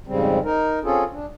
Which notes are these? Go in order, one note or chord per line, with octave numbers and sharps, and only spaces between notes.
F2 G#2 C#3 G3 C4
D#4 A#4
C4 C#4 F4 G#4 A4
D4